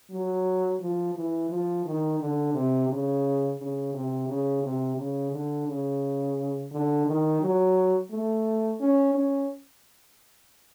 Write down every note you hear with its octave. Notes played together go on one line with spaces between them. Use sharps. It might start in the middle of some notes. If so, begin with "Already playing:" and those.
F#3
F3
E3
F3
D#3
D3
C3
C#3
C#3
C3
C#3
C3
C#3
D3
C#3
D3
D#3
F#3
A3
C#4
C#4